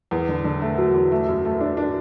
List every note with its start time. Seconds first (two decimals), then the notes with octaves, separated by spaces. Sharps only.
0.11 E2
0.29 D3
0.44 D3
0.62 A3
0.78 F#3
0.94 E2
1.12 A3
1.28 F#2
1.45 A3
1.61 D4
1.77 D4